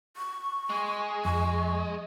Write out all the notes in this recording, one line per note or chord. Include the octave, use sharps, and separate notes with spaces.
C#6
G#3 G#5
F2 C#6